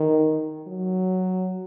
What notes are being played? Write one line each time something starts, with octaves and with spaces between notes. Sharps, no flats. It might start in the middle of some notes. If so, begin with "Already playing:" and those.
Already playing: D#3
F#3